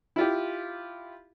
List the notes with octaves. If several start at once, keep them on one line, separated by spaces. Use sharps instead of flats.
E4 F4 G4